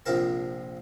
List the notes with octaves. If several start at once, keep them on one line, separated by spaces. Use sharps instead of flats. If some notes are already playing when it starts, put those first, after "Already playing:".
A#1 C3 F3 A#4 A5